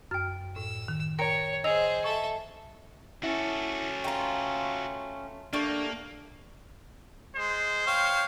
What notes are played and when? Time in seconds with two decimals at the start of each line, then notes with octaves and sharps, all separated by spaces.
0.11 F#2 G5 F6
0.56 A2 E6
0.88 D#3
1.19 A#4 C#5 G5 A#5 C#7
1.64 G#4 C5 D#5 E6 F7
2.04 A4 E5 C#6
3.23 C#4 E4 F#4 A4 E5
4.04 A3 F4 G5 A#5
5.53 G3 A3 A#3 D4 C#6
7.35 G#3 C5
7.87 C#5 F5 G5